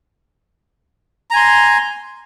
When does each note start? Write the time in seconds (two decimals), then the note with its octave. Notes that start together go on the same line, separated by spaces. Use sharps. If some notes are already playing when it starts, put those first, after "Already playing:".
1.31 A#5
1.33 G#5
1.36 C6